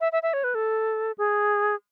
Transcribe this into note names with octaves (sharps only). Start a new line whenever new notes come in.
E5
E5
E5
C#5
B4
A4
G#4